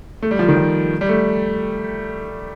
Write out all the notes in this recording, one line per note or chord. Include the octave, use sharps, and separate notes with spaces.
A3
G3
F3
D#3
F3
G3
A3